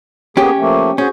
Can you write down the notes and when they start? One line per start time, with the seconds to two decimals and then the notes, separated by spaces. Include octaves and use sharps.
0.37 A#3 B3 C#4 G4 G#4
0.59 F3 A3 A#3
0.98 C#4 F#4 G#4 C5